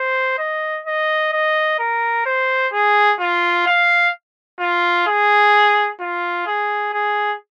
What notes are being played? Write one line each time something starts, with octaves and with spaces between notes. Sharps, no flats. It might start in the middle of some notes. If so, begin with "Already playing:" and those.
Already playing: C5
D#5
D#5
D#5
A#4
C5
G#4
F4
F5
F4
G#4
F4
G#4
G#4